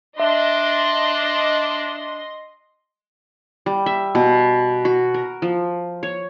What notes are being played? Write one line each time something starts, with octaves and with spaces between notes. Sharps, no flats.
D4 D#5 E5 C6
G3
E5
B2
F#4
A#4
F3
C#5